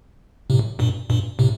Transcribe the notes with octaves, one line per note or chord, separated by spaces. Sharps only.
A2 C3
G2 A#2
G2 A#2
A2 C3